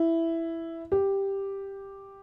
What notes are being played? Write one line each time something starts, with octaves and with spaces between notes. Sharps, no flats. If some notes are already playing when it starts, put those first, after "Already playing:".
Already playing: E4
G4